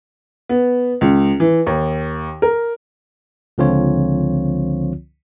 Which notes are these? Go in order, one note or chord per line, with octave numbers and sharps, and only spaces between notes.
B3
C#2
E3
D#2
A#4
C#2 D3 F3 C4 F4 C#5